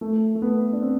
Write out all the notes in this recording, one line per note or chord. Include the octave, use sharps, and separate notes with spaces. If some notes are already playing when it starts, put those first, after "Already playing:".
A3
A3
B3
D4
C4